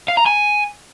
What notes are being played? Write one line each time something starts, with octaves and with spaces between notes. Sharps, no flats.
F5
A#5
G#5